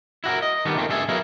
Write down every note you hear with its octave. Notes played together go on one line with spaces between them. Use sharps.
E4 F#4 G#4 A#4
D#5
D#3 G3 B3 D4
D#3 F3 G#3 A3 C4
C#2 G2 G#4 A4 E5 G#5
F#3 B3 E4 G#4 A#4 F5